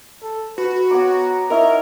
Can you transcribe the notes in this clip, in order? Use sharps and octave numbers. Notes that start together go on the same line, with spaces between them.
A4
F#4 B4
B3 C#5 A#5 D6
D#4 E4 A#4 C#5